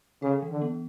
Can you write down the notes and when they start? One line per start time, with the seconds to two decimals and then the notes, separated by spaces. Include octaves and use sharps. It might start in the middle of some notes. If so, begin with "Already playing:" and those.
0.22 C#3 A4
0.42 E3
0.52 D3
0.62 B3